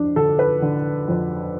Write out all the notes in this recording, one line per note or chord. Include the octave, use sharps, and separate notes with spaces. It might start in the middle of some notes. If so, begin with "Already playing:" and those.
Already playing: F2 D4
D3 A4
B4
D3
F2